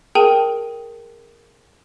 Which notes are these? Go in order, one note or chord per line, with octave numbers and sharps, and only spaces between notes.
G#4 A#4 G5 A5 D#7